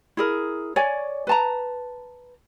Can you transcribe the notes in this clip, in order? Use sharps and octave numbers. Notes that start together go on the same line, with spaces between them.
E4 G#4 A#4
C#5 D5 G#5
B4 A5 A#5